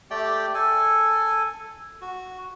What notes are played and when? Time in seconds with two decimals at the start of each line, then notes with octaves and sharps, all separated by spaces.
0.11 A3 G4 D5 G5
0.54 A4 G#5
2.01 F#4